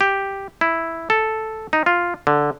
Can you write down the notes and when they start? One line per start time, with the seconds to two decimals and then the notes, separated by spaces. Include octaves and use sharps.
0.01 G4
0.61 E4
1.10 A4
1.73 D#4
1.86 F4
2.27 D3